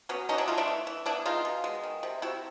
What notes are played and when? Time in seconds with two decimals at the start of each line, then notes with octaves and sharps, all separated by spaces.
0.09 F#3 B3 C#4
0.29 E3 C#4 D#4
0.38 D4 E4
0.48 A3 D#4 F4
0.58 D4 E4
0.68 E3
0.87 E3
1.06 B3 D4 E4
1.25 G#3 D#4 F4
1.45 B2
1.64 G#3
1.83 D#3
2.03 C3
2.22 C3 E4 F#4